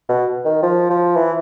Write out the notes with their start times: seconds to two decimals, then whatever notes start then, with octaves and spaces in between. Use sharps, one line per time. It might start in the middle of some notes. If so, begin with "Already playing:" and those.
0.09 B2
0.45 D#3
0.63 F3
0.90 F3
1.17 E3